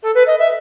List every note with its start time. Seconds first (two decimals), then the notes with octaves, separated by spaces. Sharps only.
0.02 A4
0.14 B4
0.26 D#5
0.39 E5